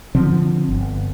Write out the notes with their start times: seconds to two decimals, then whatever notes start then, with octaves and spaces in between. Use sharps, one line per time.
0.15 D3 F3 C4
0.69 G1